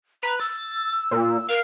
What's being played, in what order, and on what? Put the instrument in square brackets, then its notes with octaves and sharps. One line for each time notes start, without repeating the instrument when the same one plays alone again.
[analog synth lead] B4 [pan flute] A#5
[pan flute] E6 [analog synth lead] A6
[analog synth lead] A#2
[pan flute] A#4 [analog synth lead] F5